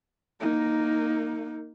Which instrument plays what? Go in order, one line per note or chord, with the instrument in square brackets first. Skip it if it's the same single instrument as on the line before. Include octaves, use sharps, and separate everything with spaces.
[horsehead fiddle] A#3 D#4